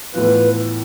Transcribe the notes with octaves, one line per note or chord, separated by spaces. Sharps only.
A2 E3 B3 F4 B4